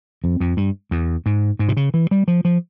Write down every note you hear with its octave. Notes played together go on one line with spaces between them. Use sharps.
F2
F2
G2
E2
G#2
G#2
C3
C#3
E3
G3
F3
F3